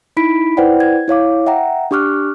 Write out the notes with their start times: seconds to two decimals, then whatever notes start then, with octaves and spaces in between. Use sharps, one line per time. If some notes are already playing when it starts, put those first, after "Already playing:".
0.17 D#4 E4 B5 B6 D7
0.57 E4 B4 C5 D5 F#5 G5
0.80 G#6
1.08 E4 C#5 F5 D6
1.47 E5 F#5 G5 A#5
1.91 D4 G4 C#6 D6 F6 F#6